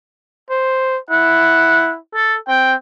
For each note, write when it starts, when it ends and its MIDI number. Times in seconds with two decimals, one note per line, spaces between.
0.50 0.98 72
1.10 1.98 64
1.10 1.89 78
2.14 2.35 69
2.48 2.76 60
2.48 2.72 79